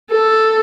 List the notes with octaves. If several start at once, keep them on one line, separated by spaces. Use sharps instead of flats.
A4